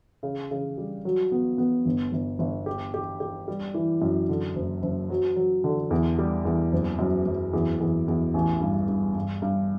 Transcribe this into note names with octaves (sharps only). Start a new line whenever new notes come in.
C#3
C#3
G3
F#3
B3
B3
G1
G1
G1
G4
G4
G4
G3
E3
F#2
D3
F#1
F#1
F#3
F#3
D3
E2
G3
E2
F#1
F#2
F#2
E2
E2
E2
A1
G2
G2
G2
G2